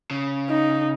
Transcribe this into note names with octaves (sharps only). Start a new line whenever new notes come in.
C#3
D#4